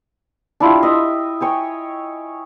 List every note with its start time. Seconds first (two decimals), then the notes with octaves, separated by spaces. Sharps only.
0.60 D4 E4 F4 G4
0.83 D#5 E5
1.41 C#5 G5 G#5